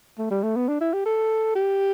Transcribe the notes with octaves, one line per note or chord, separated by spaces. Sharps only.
A3
G3
A3
B3
D4
E4
G4
A4
G4